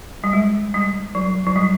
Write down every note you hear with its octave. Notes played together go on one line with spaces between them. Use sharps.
G3
G#3
G3
F#3
F#3
G3